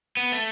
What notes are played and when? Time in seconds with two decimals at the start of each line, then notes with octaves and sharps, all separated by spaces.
0.17 B3
0.32 A3